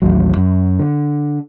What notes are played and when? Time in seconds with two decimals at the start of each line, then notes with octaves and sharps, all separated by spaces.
0.02 A1 D#2 G#2 F#3
0.37 F#2
0.79 D3